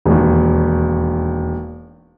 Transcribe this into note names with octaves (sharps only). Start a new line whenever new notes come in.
E1 D#2